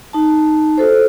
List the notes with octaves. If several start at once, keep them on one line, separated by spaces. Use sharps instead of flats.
D#4 A5
F#4 A4 C5